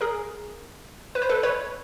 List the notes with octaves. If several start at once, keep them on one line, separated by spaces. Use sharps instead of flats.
G#4 A#4
B4
C5
A4 B4
B4 C#5